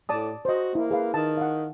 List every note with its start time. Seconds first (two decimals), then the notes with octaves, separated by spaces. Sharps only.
0.09 A2 D5 A5 D#6
0.45 F#4 C5 D#5
0.75 A#3 E4
0.91 G#4 B4 F5
1.14 D#3 A5
1.37 F5 F#5